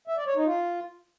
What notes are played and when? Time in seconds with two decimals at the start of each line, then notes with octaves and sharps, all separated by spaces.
0.08 E5
0.17 D5
0.27 C#5
0.36 D#4
0.46 F4